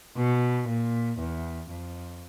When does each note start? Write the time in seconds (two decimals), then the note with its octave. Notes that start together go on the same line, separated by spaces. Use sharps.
0.17 B2
0.68 A#2
1.19 E2
1.70 F2